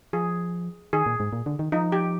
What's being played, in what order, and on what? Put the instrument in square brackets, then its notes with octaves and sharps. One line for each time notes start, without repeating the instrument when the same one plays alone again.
[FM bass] F3 [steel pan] G#4
[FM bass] D#3 [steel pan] G#4
[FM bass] A#2
G#2
A#2
D3
D#3
[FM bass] F3 [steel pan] D#4
[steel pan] G4